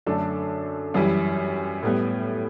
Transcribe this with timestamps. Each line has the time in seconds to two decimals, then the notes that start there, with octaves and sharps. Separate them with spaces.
0.06 F#2 D3 A3 D4 A4
0.94 F#2 E3 G3
1.83 A2 G3 B3